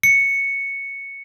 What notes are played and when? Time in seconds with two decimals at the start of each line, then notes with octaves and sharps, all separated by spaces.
0.03 C#7